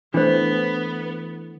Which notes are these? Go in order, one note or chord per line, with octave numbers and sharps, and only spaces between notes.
E3 A3 B3 D4 C5